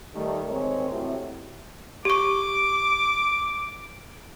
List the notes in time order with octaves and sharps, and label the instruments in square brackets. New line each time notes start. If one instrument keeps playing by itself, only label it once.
[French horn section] D#3 G3 A3
D#3 G#3 C4 G#4 A#4 C#5
A2 C3 F#3
[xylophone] G4 C#6 [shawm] D6